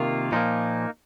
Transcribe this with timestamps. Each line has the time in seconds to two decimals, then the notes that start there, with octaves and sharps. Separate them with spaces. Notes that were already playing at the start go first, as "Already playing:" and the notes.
Already playing: C3 D#3 A#3 F4
0.32 A#2 F3 A#3 D#4